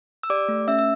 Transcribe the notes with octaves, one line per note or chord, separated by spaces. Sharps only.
E6
G4 D5 D6
A3
C#4 E5 E6
E6